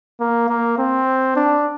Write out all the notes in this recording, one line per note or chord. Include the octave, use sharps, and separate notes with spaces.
A#3
A#3
C4
D4